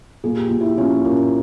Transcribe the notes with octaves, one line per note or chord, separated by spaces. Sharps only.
A#2 G#4
G4
A#2 F4
E4 G4
A#2 C#4 F4
A#2 A#3 C#4